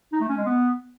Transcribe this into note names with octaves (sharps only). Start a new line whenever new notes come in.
D#4
A3
C#4
G#3
B3